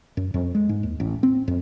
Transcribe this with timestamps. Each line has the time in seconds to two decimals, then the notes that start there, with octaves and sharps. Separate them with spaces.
0.17 F#2
0.34 F2
0.55 G#3
0.69 G#2
0.83 D#2
1.00 A1
1.23 C4
1.48 F2